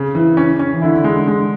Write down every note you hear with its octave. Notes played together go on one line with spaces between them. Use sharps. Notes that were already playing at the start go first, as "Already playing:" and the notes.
Already playing: C#3
E3
C#4
C#4
E3
D3 E4
G#3
G#3